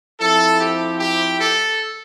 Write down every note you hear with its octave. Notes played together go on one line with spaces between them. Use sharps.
F3 C4 E4 A4
G4
G4
A4